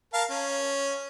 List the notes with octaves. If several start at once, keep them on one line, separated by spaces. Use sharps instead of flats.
A#4 F5 A5
C#4